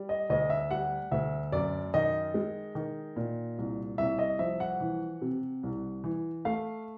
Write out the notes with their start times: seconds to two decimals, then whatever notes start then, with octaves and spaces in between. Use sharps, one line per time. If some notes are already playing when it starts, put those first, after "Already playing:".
Already playing: G3
0.09 D#5
0.30 D2 D#5
0.50 E5
0.71 G3 F#5
1.11 D2 E5
1.52 F#2 D5
1.94 D#3 D#5
2.34 G#3
2.75 D#3
3.16 A#2
3.58 C2
3.98 C2 E5
4.19 D#5
4.39 F3 E5
4.60 F#5
4.80 E3
5.21 C3
5.63 C2
6.04 E3
6.45 A3 F5